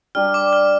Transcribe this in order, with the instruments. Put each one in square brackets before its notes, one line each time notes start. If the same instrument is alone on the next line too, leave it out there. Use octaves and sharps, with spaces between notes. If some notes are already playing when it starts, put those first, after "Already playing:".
[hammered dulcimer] G3 D4 G4 [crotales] F6
[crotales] D6
F6